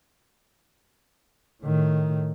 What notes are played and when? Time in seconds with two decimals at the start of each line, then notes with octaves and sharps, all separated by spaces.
1.63 A2 D#3